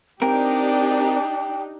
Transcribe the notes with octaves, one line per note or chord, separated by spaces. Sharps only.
C4 D4 D#4 G4 A#4 G5